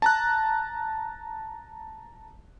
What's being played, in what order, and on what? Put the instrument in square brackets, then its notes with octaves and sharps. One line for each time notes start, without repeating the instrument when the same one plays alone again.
[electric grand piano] A5 A#5 F#6